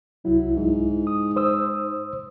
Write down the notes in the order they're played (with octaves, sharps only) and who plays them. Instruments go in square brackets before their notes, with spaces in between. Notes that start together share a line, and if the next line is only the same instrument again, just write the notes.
[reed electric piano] C2 E4 [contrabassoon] F#3
[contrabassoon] G#2
[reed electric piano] D#6
C5 D#6 E6